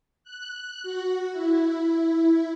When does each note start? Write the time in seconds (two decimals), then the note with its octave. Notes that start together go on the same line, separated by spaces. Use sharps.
0.24 F#6
0.83 F#4
1.32 E4